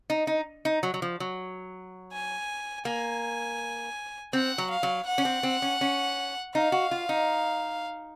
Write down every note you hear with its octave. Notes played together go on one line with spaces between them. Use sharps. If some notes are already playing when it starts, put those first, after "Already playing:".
D#4
D#4
D#4
F#3
F#3
F3
F#3
G#5
A#3 G#5
C4 F#5
F#3
F5
F#3
F#5
C#4
C4
C4
C#4
C#4
D#4 F5
F#4
F4
D#4